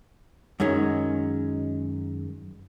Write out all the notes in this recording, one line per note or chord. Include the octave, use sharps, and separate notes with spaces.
F#2 D#3 G#3 C#4